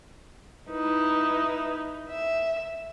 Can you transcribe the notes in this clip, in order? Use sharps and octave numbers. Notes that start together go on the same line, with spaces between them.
D#4 E4 B4
E5